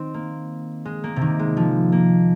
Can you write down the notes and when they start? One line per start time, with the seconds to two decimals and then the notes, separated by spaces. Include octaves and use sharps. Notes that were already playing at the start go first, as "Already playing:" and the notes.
Already playing: D#3 C4
0.14 A#3
0.85 G#3
1.04 A#3
1.16 C3
1.21 D#3
1.39 G#3
1.57 F3
1.92 A#3